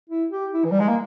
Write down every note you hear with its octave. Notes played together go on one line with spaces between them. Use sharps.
E4
G4
E4
E3
G3
G#3
A#3